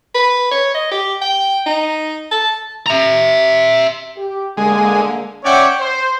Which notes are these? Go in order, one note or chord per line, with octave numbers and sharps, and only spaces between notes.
B4
C#5
D#5
G4
G5
D#4
A5
E5 A#5
G4
D3 G#3 A#3
C#4 C#5 D5 E5 F#5 G5
C5